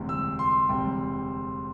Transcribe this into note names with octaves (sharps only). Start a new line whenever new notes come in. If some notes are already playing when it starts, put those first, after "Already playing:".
Already playing: E1 D2 C3 G3
E6
C6
E1 D2 C3 G3 G5